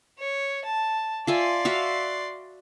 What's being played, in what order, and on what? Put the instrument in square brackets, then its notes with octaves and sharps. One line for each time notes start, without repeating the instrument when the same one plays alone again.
[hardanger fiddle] C#5
A5
[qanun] F4 E5 G#5 [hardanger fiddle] D5 C6
[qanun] F#4 E5 F5